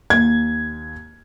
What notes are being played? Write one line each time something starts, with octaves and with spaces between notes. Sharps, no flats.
D#2 G#6